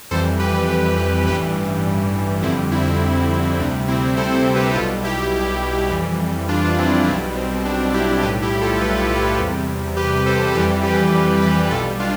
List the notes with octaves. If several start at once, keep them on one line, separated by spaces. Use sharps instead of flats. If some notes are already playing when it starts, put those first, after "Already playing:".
F2 E3 G3 A4 C5
G4 B4
G4 B4
A1 G2 E3 G3 G4 B4
F2 D3 G3 C4 E4
C4 E4
D2 C3 G3 D4
C4 E4
A4 C5
A4 C5
G4 B4
B1 B2 G3 F4 A4
E4 G4
F2 E3 G3
D4 F4
C4 E4
B1 B2 G3 C4 E4
C4
D4
E4 G4
B1 A2 G3 G4 B4
E4 G4
F4 A4
G4 B4
F4 A4
E2 C3 G3
G4 B4
A4 C5
F2 E3 G3 G4 B4
G4 B4
G4 B4
B1 B2 G3 F4 A4
D4 F4